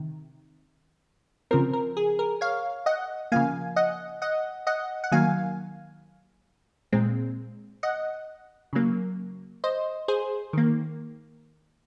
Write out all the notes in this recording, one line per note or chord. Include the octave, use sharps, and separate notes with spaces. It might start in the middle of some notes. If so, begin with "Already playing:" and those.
Already playing: C3 D#3
C#3 F3 C4 A#4
A#4
G#4
A#4
C#5 F5
D#5 F#5
C#3 F3 A#3 F5 G#5
D#5 F#5
D#5 F#5
D#5 F#5
F#5
D#3 F#3 A#3 F5 G#5
A#2 G#3 C4
D#5 F#5
C#3 F#3 A#3
C5 D#5
G#4 C5
D#3 A#3